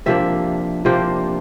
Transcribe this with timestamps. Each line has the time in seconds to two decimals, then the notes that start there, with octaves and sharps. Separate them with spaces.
0.06 C3 F3 A#3 D4 E5
0.85 C3 F3 A#3 D4 C5